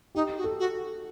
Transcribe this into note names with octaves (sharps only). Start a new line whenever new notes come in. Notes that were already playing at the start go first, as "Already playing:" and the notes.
D#4 G4
F#4
A4
F#4